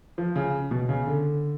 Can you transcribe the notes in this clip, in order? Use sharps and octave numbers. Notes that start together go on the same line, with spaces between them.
F3
C#3
B2
C#3
D3